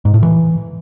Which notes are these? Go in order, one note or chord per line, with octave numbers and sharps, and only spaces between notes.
G#2
A2
E3